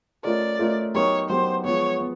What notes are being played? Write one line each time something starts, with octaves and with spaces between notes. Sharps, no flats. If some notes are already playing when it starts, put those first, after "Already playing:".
A3 C#4 F4 A#4 D5 D#5
A3 C#4 F4 A#4 D#5
F#3 B3 D#4 G4 A#4 C#5
F#3 B3 D#4 G4 A#4 C5
F3 G#3 B3 C#5
B3